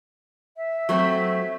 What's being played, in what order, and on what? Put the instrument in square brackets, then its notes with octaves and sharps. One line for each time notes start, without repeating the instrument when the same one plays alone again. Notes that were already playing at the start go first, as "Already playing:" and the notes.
[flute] E5
[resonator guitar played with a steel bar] F#3 A3 C4